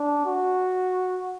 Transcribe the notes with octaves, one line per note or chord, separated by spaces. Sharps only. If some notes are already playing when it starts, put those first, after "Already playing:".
Already playing: D4
F#4